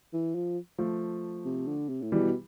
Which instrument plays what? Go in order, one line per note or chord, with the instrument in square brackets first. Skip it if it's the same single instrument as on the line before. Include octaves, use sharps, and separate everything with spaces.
[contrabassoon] E3
F3
[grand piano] F3 A3
[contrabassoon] C3
D3
C3
A2
[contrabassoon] B2 [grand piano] E3 G3